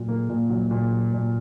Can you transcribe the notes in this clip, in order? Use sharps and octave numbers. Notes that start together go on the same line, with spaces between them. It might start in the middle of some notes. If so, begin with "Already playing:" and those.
Already playing: A#2 F#3
A#3
A#2
F#3
A#2
F#3
A#2